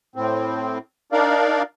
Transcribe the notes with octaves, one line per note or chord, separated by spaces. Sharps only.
A2 C4
D4 D#4 A#4 D5 F5